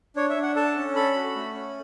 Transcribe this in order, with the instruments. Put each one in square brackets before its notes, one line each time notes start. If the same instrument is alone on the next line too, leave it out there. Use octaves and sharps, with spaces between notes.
[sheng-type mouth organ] D4 C#5
E5
D4
F#5
A4 A5
C#4
A4 B5
F#4
A3
C#4